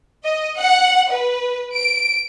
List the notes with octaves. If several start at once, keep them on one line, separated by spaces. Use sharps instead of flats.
D#5
F#5
B4
D7